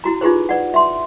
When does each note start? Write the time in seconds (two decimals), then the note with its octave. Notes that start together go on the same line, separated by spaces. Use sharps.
0.04 E4 F#4 A#5
0.21 D#4 F4 G4 G#4 B4 C5
0.49 B4 D5 F#5
0.74 E5 C6